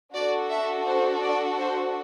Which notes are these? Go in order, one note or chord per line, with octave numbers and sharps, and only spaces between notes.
D4 F#4 A4 D5
E5
C5
D5
C5